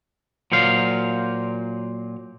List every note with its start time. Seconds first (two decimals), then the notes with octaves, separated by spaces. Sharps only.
0.52 A#2 F#3 C5 F5